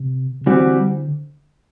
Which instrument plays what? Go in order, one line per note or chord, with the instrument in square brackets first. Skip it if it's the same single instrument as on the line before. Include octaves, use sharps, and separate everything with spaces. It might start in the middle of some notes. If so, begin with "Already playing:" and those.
Already playing: [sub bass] C3
C3
[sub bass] D3 [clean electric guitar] E3 G3 C4 F#4